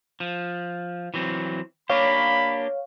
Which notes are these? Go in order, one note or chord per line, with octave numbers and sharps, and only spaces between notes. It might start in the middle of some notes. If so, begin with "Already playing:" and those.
F3
E3 F#3 C4
A#3 D4 G4 C#5 F5 B5